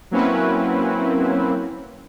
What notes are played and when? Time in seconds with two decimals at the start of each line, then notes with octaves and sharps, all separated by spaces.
0.11 F#3 A#3 C4 C#4 E4 B4